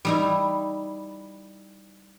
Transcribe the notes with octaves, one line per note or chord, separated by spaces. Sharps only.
G3 D#4 E4